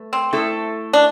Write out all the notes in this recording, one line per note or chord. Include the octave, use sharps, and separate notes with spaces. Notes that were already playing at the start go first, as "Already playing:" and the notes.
Already playing: A3 B4
C4
A3 E4 A4
D4